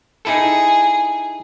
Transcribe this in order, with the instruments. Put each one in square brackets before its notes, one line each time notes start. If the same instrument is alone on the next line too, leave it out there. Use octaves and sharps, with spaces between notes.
[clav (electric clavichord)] D#4 E4 A4 [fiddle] G#4